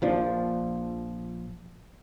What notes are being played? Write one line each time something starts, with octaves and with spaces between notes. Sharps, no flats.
A#1 F3 D4